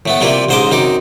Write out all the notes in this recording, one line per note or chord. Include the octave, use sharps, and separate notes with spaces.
A2 A3 B3
C3 G3 A#3 E4 F4
A1 G#2 C5 D#5 G#5 D6
F#2 C4 D#4 D6